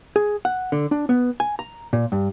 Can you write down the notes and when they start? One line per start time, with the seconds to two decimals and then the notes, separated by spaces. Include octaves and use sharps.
0.16 G#4
0.45 F#5
0.72 D3
0.91 D4
1.09 B3
1.40 G#5
1.59 A#5
1.93 A#2
2.12 G2